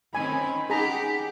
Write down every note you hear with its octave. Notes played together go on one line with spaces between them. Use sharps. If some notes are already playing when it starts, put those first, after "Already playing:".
D#3 C4 C#4 G#5 B5
D#4 G4 G#4 F#5 A#5 B6